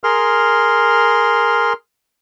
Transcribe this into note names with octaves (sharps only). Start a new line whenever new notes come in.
G#4 A#4 C6 F6